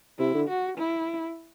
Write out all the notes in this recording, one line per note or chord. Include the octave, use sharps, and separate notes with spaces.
C3 E4
D3
F#4
E4